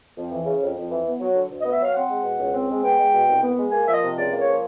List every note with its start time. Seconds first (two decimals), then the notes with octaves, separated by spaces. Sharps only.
0.16 F2
0.31 E3
0.45 C#3
0.61 F2
0.76 F2
0.90 E3
1.06 B3
1.20 F#3
1.35 D3
1.50 D2
1.60 D#5
1.64 B3
1.72 E5
1.79 F#3 F5
1.94 C4 F#5
2.09 G#3
2.23 B2
2.38 C#2
2.54 C4
2.69 G#3
2.83 B3 G5
2.99 G#3
3.13 B2
3.28 C2
3.42 B3
3.58 G#3
3.72 A#3 G#5
3.87 F3 E5
3.94 D#5
4.02 C3
4.16 C#2 D5
4.32 A#3
4.39 C#5
4.46 F3